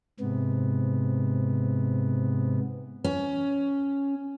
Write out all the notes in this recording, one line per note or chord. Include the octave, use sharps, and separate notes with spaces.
G#2 C3 B3
C#4